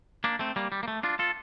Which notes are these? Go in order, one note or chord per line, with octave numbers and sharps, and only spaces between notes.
A#3 D4
A3 C4
G3 A#3
G3
A#3
A3
D4 F4
F4 A4